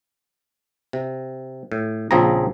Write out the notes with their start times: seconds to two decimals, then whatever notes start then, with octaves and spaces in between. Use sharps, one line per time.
0.93 C3
1.72 A2
2.11 A#1 C#3 F3 C4 G#4 A#5